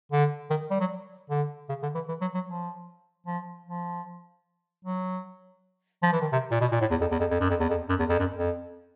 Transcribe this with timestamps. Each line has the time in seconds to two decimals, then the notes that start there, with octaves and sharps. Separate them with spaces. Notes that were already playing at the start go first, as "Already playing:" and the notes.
0.12 D3
0.50 D#3
0.71 G3
0.80 F#3
1.30 D3
1.69 C#3
1.83 D3
1.95 E3
2.09 E3
2.21 F#3
2.35 F#3
2.47 F3
3.26 F3
3.67 F3
4.85 F#3
6.03 F3
6.12 E3
6.22 D#3
6.32 C3
6.51 A#2
6.61 B2
6.72 A#2
6.81 A2
6.91 E2
7.01 F2
7.11 E2
7.20 F2
7.31 F2
7.41 F#2
7.50 F2
7.60 E2
7.70 F2
7.89 F#2
7.99 E2
8.09 F2
8.19 F#2
8.39 F2